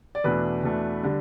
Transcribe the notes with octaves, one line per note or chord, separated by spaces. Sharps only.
D5
E2 B2 A3 D4 B4
E2 B2 A3 D4
D3 G3 D4